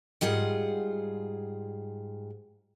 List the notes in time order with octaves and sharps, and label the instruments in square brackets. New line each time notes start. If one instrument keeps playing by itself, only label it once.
[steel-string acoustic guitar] G#2 G3 F4 G#4 F#5